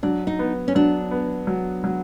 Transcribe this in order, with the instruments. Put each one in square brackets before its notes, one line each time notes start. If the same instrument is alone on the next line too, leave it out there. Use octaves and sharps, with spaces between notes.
[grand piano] F#3 [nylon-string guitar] D4
[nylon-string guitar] D#4
[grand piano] B3
[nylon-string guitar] C#4
[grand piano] F#3 [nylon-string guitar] D4
[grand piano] B3
F#3
F#3